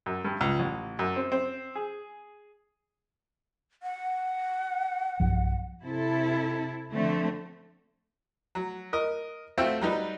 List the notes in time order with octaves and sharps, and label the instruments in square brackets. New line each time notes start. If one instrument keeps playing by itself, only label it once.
[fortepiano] F#2
G2
C#2
A1
F#2
C4
C4
G#4
[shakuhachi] F#5
[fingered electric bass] B1 G2 F3
[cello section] C3 E4 A4
D3 F3 A3 C4
[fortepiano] F#3
A#4 D#5
A3 C4 F4 F#4 E5 G5
F#3 G3 D#4 B4